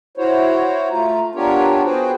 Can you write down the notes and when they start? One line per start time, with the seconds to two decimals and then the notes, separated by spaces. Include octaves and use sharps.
0.17 E4 F#4 C5 C#5
0.91 A3 F4 A#5
1.35 B3 D4 F4 G4 A#4 C#5
1.84 B3 F#4 G#4 B4 C5 G5